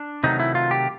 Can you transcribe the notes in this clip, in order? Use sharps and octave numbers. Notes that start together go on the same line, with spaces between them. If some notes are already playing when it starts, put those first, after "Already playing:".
Already playing: D4
C3 D#3 F#3 A3 D#4
E4
F4
G4